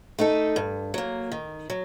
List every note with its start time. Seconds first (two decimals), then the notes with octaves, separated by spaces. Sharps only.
0.19 A3 D#4 A4
0.56 G2
0.94 F#3 A#3
1.32 D#3
1.70 F#3